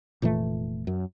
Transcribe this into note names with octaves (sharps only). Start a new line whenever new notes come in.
F1 A#2 E3 A3
F#2